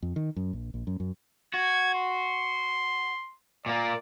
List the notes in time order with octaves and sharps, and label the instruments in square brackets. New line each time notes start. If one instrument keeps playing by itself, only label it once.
[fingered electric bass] F2
D#3
F#2
A#1
A#1
F#2
F#2
[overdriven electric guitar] F#4 [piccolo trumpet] G#6
[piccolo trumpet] C6
[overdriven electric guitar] A#2 A#3 [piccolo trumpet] D5